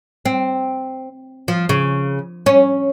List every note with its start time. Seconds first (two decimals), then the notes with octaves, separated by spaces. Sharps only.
0.25 C4
1.48 F3
1.69 C#3
2.46 C#4